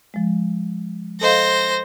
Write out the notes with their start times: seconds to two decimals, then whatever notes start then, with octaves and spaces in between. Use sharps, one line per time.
0.14 F3 G#3
1.21 A4 C5 D#5 F5 A#6